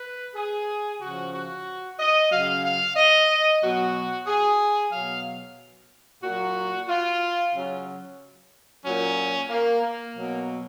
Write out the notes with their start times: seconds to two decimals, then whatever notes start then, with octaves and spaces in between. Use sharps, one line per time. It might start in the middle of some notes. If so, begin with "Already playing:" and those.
Already playing: B4
0.35 G#4
1.01 C#3 F3 F#4
1.33 F#4
1.99 D#5
2.31 C#3 F#3 F5
2.63 F5
2.96 D#5
3.61 B2 F#3 F#4
4.27 G#4
4.91 B2 F#3 F5
6.22 A#2 F#3 F#4
6.88 F4
7.52 C#3 F#3
8.84 A#2 F#3 C#4
9.49 A#3
9.82 A#3
10.14 B2 F#3